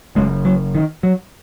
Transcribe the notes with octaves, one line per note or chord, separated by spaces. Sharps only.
F#1 F#2 C#3 G#3
F#3
D#3
F#3